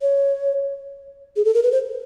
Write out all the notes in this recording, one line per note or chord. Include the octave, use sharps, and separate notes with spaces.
C#5
G#4
A4
A#4
B4
C5